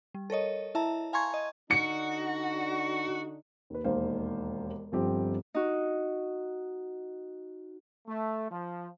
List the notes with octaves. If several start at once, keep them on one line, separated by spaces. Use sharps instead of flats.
G3
A4 A#4 C#5 D#5
E4 E5 A5 A#5
F5 G#5 A#5 C6 C#6 G#6
D#5
D3 D4 D#4 F#4 C#7
D#2 B4
E1 D#2 C5 F5
G1 F3 C4 G4
D#4 F#4
A3
F3